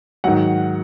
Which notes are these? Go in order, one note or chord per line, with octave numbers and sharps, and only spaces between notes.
G#2 D#3 F#3 F#5